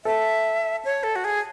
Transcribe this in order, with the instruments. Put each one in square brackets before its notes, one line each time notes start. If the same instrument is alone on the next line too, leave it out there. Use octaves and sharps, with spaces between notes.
[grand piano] A4 [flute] E5
[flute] C#5
A4
F#4
G#4